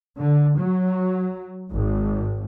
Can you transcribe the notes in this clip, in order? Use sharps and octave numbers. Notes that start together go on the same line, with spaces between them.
D3
F#3
G#1